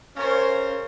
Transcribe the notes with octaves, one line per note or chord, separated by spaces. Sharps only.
C#3 C#4 A#4 C5 C#5 C#6